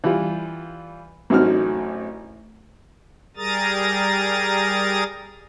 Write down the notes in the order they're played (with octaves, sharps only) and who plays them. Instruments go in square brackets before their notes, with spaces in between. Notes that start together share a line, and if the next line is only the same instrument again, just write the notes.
[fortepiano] E3 G3 F4
A1 F#2 C4 D#4 F#4 F6
[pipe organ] G3 G#4 A#4 A#5 D#6 A6